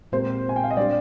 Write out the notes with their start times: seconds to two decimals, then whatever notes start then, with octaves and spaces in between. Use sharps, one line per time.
0.12 A#2 G#3 C4 G4 A#4 C5
0.49 G#5
0.56 G5
0.64 F5
0.71 D#5
0.77 G3 D4 G4 D5